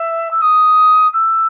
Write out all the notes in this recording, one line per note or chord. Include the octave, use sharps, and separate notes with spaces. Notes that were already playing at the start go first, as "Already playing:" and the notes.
Already playing: E5
E6
D#6
E6